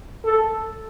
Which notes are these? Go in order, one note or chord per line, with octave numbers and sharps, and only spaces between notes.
A4